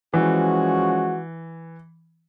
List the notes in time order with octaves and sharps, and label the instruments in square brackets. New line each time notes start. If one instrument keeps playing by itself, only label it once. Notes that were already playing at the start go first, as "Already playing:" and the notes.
[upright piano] E3 [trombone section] F3 G#3 C#4 F#4